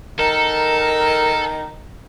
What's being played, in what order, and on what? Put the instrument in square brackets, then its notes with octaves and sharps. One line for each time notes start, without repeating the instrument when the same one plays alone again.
[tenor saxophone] D#3 [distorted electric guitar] A4 [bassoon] A#4 [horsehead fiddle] A#5